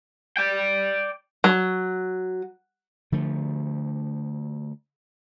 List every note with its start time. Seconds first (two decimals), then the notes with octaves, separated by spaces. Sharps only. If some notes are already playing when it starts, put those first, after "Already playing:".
0.37 D5 G5
1.44 F#3
3.12 D3 F3 A3